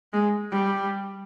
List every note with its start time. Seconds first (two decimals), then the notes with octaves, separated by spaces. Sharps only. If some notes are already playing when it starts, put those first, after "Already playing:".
0.13 G#3
0.51 G3